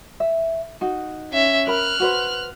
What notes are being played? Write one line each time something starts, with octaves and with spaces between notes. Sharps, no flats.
E5
D#4 F#4
C#4 E5
A#4 B5 F6 F#6
F#4 B4 C5